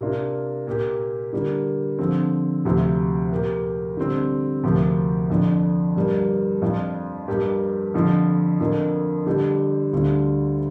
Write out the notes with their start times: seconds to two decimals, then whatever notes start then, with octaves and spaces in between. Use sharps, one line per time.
0.01 C3 A#3 D4 F4
0.67 A#2 A#3 G4
1.33 D3 G3 A#3
1.99 D3 F3 C4
2.65 D2 C3 F3
3.31 A#2 A#3 G4
3.97 D3 G3 C4
4.63 D2 C3 F3 A#3 G4
5.30 F2 D3 F3 D4
5.96 G2 G3 A#3
6.62 F2 F3 D4 F4
7.27 G2 G3 A#3 G4
7.94 F2 D3 F3
8.60 F2 D3 A#3 F4
9.26 D3 G3 D4 G4
9.93 D2 D3 G3 D4 F4